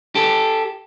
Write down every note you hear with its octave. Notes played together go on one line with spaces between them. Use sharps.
G4 A4